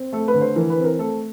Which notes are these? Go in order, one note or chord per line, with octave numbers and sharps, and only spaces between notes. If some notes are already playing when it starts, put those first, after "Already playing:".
Already playing: C4
A3 A4
B4
D3
C5
E3 A#4
B4
C4
A#4
A3 A4